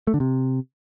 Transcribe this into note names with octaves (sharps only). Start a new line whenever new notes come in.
A3
D3
C3